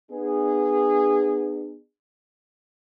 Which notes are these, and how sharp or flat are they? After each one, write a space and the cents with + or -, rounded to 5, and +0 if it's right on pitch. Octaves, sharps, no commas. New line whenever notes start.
B3 +0 D4 +45 G#4 -20